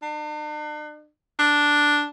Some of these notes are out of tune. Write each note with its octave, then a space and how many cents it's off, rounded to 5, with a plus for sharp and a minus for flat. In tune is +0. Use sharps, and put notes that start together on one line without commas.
D4 +45
D4 +0